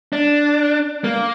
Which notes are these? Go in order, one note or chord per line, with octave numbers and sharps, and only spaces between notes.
D4
A#3